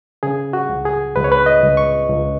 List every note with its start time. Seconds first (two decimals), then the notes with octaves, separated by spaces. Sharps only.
0.23 C#3 G#4
0.53 F#4
0.69 C#2
0.85 G#4
1.16 C#2 B4
1.24 C#5
1.32 B4
1.46 D#5
1.63 C#2
1.77 C#6
2.09 C#2